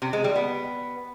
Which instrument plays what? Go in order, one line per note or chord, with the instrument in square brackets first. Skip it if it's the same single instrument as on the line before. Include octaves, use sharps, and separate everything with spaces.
[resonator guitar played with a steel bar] C3
G#3
G3
B3